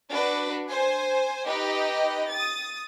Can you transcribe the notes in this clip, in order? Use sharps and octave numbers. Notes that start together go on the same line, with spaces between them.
D4 F#4 B4
C5 G#5
D#4 G4 B4 D#5
D#6 A6